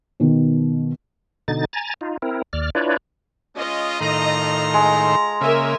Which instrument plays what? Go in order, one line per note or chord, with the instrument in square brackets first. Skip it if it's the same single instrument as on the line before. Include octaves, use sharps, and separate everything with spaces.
[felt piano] B2 D#3
[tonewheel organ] B2 D3 D#4 A6
G#5 A#5 A6
D#4 F4
C4 E4 A#4
D#2 D5 F6
D4 E4 F4 B4 C#5 D5
[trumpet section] G#3 C#4 F4 [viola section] D#5
[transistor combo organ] A2 D#3 C6 [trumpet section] F4 A4 A#5
[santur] G#3
[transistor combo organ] C#3 A#3 [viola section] A#4 E5 G#5